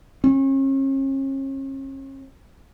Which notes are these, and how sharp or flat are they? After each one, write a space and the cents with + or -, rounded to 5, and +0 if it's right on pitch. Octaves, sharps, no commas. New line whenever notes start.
C#4 -40